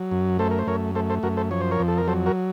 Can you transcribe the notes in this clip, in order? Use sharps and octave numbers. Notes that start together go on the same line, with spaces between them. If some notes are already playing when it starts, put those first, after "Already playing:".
Already playing: F#3
F#2
A3 A4 C5
A#4
C5
F#2 A#4 C#5
A3 A4 C5
A4 C5
F#2 F#4 A#4
A4 C5
F3 C#5
C5
A#4 C#5
F2
A4
A#4
F#3 A4 C5
F#4 A#4